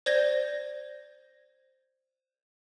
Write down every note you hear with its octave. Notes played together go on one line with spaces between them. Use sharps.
C5 D5 G6 G#6 A#6 G7